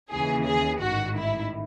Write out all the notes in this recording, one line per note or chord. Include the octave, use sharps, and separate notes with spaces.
D#2 C#3 E3 G#4
G#4
A1 G#2 D#3 F#4
E4